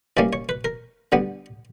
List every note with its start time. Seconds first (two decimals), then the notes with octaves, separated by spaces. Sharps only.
0.17 E3 G3 A#3 C#4 D5
0.33 C#5
0.49 B4
0.65 A#4
1.12 D3 G3 B3